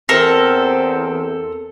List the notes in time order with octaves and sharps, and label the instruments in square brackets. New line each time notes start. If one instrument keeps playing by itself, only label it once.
[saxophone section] E2 C4 [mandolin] A4 A#4